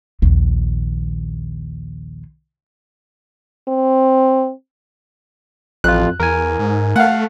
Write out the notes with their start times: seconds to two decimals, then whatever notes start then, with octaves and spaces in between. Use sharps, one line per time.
0.22 A#1 D#2
3.68 C4
5.84 A1 F2 F4 F#6
6.20 E2 A#4 G#5
6.59 G#2
6.96 A3 F5 F#5